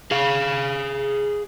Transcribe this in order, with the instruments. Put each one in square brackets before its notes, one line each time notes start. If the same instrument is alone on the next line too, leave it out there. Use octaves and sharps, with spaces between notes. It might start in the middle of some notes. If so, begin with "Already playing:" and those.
[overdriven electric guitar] G#4 F5